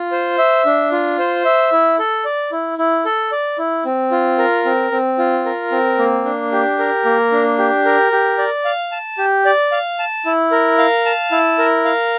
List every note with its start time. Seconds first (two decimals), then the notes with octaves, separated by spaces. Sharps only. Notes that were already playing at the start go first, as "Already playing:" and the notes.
Already playing: F4
0.12 C5
0.38 E5
0.66 D4
0.92 F4
1.19 C5
1.45 E5
1.72 E4
1.99 A4
2.25 D5
2.52 E4
2.79 E4
3.05 A4
3.32 D5
3.58 E4
3.85 C4
4.11 F4
4.38 A#4
4.65 C4
4.91 C4
5.18 F4
5.45 A#4
5.72 C4
5.99 A#3
6.25 D4
6.52 G4
6.79 A#4
7.05 A#3
7.32 D4
7.58 G4
7.85 A#4
8.12 G4
8.38 D5
8.65 F5
8.92 A5
9.18 G4
9.45 D5
9.72 F5
9.99 A5
10.26 E4
10.51 A#4
10.78 F5
11.05 A5
11.31 E4
11.59 A#4
11.85 F5